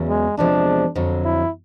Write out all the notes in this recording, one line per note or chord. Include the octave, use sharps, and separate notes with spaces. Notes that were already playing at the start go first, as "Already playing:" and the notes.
Already playing: E2 C#3 F#3
G#3
E2 C3 F3 G#3 D4
F2 D3 F#3
E4